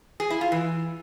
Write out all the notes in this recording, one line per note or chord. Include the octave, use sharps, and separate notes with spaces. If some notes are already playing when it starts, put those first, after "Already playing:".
G#4
E4
F4
E3